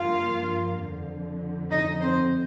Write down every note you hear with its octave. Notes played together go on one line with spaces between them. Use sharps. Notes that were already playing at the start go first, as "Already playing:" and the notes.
Already playing: G2 F3 A#3 F4 F5
F2 D3 F3
D#4 D#5
C4 C5